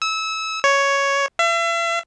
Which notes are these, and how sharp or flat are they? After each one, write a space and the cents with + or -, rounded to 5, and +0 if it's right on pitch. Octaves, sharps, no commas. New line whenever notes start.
E6 -25
C#5 +5
E5 +40